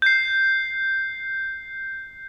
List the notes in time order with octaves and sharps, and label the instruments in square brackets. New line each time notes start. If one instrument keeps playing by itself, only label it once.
[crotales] G6 C7